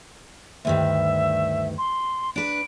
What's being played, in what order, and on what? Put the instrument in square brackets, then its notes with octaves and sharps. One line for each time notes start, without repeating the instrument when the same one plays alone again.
[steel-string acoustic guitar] D2 G2 D#3 [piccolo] E5
[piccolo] C6
[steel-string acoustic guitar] D4 B4 [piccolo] D7